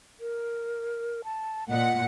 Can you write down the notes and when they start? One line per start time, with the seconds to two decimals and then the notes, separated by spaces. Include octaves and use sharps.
0.20 A#4
1.24 A5
1.70 A#2 D#5 F#5